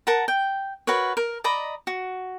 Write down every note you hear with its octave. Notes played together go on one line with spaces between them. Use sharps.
A#4 F#5 A5 A#5
G5
F#4 A#4 B4 C#5
A#4
D5 D#5 A#5 B5
F#4